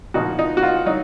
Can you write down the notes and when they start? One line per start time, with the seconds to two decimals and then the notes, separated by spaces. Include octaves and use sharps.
0.14 A#2 F3 D#4 F#4
0.39 D#4
0.57 F#4
0.63 F4
0.86 F#3 D#4